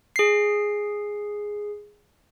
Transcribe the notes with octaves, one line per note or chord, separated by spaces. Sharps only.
G#4 C7